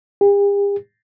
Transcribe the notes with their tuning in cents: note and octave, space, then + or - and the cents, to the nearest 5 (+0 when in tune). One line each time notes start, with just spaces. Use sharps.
G4 +45